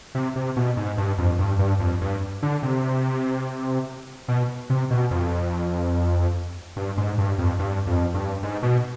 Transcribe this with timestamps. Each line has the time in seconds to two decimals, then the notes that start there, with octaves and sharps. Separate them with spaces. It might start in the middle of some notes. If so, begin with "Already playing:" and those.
0.15 C3
0.36 C3
0.57 B2
0.77 G#2
0.98 G2
1.18 F2
1.39 G2
1.59 G2
1.80 F2
2.01 G2
2.43 D3
2.63 C3
4.28 B2
4.70 C3
4.91 B2
5.11 F2
6.77 G2
6.98 G#2
7.18 G2
7.38 F2
7.59 G2
7.87 F2
8.14 G2
8.43 G#2
8.63 B2